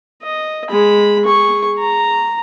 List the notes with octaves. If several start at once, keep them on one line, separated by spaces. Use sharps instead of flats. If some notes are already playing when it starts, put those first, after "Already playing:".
D#5
G#3 B5
G#4 C#6
A#5